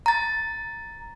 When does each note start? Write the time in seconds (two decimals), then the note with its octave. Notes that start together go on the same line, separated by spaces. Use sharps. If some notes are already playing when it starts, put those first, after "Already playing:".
0.06 A#5 A6